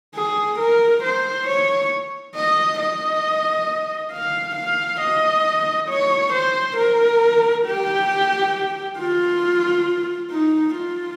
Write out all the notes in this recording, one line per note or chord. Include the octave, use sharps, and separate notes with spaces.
G#4
A#4
C5
C#5
D#5
D#5
F5
F5
D#5
C#5
C5
A#4
G4
F4
D#4
F4